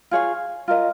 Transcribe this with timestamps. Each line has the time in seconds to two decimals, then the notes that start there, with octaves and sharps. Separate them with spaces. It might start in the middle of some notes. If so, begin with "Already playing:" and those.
0.11 F4 G#4 C#5 F5
0.68 F4 A#4 D#5